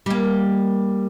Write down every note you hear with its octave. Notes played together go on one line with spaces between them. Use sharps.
G3 A#3